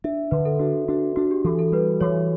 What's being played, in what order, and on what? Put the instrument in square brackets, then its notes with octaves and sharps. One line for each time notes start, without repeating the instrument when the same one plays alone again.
[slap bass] D4 [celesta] E5
[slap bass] D3 [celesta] B4
[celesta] A4
[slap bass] D4 [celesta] F#4
[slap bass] D4 [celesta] F#4
[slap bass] D4 [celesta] F#4
[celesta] G4
[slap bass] E3 [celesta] A4
[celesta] A4
[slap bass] G3 [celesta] B4
[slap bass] E3 [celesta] C#5